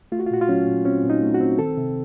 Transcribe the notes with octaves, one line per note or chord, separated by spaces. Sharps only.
A3 F4
F#4
F4
A#2 F#4
F4
F#3 C#4
A#2
C4 C#4
A#2
D#4
A3
F#4
C4
D#3 A4
C3